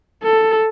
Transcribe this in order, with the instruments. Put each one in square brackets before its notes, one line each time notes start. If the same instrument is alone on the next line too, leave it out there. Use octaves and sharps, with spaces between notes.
[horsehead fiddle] A4